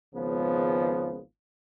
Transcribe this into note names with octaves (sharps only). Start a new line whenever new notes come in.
G#1 C#2 C#3 F3 B3